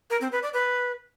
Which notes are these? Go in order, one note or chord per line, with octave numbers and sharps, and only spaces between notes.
A#4
C4
B4
D5
B4